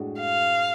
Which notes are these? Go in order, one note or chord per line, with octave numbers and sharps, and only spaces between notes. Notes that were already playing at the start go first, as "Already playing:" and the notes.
Already playing: A2 G#3 D4 F#4
F5